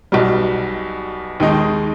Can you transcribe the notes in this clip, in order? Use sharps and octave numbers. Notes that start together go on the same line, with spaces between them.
B1 B2 G3
D#2 D#3 G#3 D#4